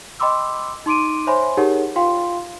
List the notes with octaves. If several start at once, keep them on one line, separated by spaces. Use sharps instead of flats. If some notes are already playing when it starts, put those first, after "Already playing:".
D#5 G5 B5 C6 D6 E6
D#4 C6 D6 D7 D#7
C5 C#5 E5 G#5 B5 C6
D#4 G4 G#4 A#4 C#5 F#5
F4 F5 G5 C6